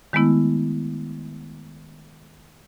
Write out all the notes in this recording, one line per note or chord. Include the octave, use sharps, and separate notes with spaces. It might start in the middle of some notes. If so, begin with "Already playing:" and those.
D#3 G#3 A3 B3 E4